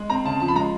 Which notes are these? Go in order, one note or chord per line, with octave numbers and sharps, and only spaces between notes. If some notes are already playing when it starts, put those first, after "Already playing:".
Already playing: G#3
C4 A#5
C#3 A5
F3 A5
B5
G#3 A#5